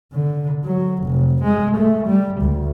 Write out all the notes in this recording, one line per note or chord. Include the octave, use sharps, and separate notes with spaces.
D3
F#3
F1
G#3
A3
G3
D2